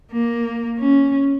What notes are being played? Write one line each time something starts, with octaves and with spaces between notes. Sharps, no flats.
A#3
C#4